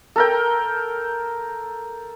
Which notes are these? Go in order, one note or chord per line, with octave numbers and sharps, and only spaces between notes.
A4 A#4 G5